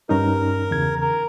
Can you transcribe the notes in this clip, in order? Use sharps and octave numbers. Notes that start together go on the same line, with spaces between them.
G2 C#4 D#4 A#4
E2 C#3 G#6
A#4